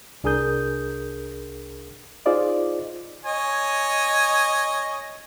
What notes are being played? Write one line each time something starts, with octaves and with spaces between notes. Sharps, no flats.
C2 D4 G#4 A#4 D#6 G6
D#4 F4 G#4 C5 D5 D#5
C#5 D#5 G#5